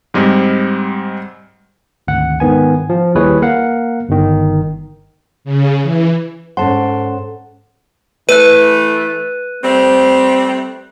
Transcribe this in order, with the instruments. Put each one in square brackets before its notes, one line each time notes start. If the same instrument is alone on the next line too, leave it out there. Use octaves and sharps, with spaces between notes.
[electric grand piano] G#2 G3 G#3 C4
[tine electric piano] G#1 D2 F#5
G#2 D#3 B3 G#5
F3
D#2 G3 E4 G#4 B4 C#5
A#3 A#4 F5 F#5
G1 D#3
[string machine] C#3
E3
[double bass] G#2 [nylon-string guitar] C#4 A4 C5 [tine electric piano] F#5 [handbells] A5 C6
[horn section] E3 A3 [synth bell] B4 [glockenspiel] F#6 D#7
[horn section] G3 A3 C4